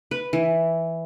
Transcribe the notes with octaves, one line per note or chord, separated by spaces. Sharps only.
B4
E3